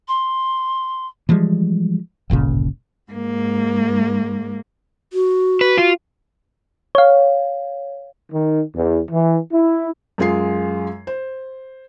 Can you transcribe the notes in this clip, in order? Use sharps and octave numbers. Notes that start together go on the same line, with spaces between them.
C6
E3 F3 G3 G#3
D1 G1 A#2 C#3
G#2 A#3
F#4
B4
F4
C#5 F5
D#3
E2
E3
E4
F#2 G#3 F4 G#4 C7
C5